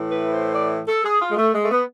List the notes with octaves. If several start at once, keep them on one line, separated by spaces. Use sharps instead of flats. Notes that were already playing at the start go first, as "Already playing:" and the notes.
Already playing: A2 E3
B4
C5
D5
A4
G#4
F4
G#3
A3
G#3
A3
B3